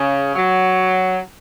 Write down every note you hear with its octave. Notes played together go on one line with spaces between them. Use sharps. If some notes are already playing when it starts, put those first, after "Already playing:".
Already playing: C#3
F#3